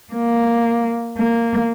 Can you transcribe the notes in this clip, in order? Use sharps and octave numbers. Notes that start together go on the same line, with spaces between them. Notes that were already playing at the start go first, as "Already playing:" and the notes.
A#3
A#3